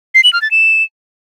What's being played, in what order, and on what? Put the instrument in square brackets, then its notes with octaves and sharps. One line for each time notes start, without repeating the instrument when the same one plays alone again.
[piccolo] C7
F#7
F6
A6
E7